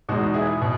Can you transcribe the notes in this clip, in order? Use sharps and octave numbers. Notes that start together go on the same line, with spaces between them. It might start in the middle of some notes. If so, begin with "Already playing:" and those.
E2 B2 G#3 D#4 F#4
E4 G#4
B2